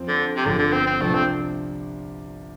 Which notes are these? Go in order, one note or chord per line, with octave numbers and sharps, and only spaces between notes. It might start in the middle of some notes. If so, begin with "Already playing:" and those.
Already playing: F2 F3 C4
D3
C3
G1 F2 D3 F3
D3
C4
C4
C2 C3 F3 A3 D4
C4